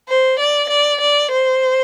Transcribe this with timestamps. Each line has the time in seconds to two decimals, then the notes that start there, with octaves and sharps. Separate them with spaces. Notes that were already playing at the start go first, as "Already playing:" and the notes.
0.09 C5
0.40 D5
0.70 D5
1.01 D5
1.32 C5